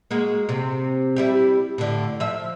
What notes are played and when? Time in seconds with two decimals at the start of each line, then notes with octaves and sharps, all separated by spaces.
0.11 G#3 A#3 F#4
0.49 C3
1.16 G3 E4 G4
1.78 A2 D3
2.20 F3 E5